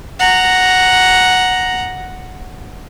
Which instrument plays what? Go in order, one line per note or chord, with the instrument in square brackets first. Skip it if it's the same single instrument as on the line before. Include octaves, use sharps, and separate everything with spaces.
[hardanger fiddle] F#5 A#5